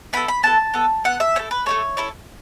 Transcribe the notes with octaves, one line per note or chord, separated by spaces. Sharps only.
B3 E4 A4 B5
B5
B3 E4 A4 A5
B3 A4
B3 A4 F#5
E5
A3 E4 A4 C#5
B4
A3 E4 A4 C#5
C#4 E4 A4